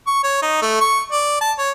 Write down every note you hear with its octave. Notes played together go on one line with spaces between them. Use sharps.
C#6
C#5
D#4
A3
C#6
D5
A5
C#5